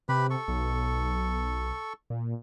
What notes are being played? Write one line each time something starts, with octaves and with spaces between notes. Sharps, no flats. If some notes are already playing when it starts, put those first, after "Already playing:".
C3 G4 B4 B5
A4 C#6
B1
A#2